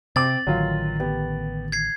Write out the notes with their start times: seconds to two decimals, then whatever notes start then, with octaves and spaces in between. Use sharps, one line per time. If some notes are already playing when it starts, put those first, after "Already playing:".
0.16 C3 C4 D6 A6 F#7
0.47 A1 D3 D#3 F#3 F4
1.00 B3 G4
1.72 G#6 C7